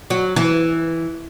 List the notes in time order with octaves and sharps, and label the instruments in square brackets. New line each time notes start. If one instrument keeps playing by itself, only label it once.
[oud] F#3
E3